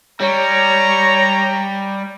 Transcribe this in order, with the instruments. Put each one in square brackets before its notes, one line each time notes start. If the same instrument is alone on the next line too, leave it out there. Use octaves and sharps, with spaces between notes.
[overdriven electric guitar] G3 [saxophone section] C#5 [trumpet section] A#5